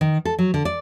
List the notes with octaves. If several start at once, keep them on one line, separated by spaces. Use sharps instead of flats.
D#3
A4
F#3
D3
D5